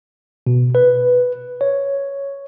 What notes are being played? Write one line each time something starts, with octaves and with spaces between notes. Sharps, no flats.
B2
B4
C#5